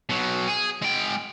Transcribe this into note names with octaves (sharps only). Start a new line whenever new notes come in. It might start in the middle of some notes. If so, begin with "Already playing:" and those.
B2 F#3
G#4
G#3 G5